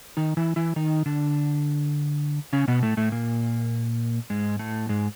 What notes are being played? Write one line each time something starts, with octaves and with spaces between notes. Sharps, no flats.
D#3 D#4
E3 E4
E3 E4
D#3 D#4
D3 D4
C#3 C#4
B2 B3
A2 A3
A2 A3
A#2 A#3
G#2 G#3
A2 A3
G#2 G#3